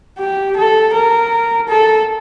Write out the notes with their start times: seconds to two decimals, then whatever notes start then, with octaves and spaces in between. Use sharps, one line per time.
0.19 G4
0.57 A4
0.94 A#4
1.68 A4